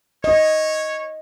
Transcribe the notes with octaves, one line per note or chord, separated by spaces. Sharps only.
C#5 D#5